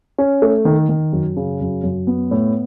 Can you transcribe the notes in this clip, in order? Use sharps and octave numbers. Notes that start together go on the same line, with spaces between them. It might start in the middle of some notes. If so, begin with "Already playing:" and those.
C#4
A3
D#3
D#3
F#2
C#3
F#2
F#2
B3
A2